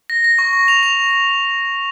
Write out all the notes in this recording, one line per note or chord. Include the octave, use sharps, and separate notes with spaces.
A#6
A#6
C#6
C#6
F7
F7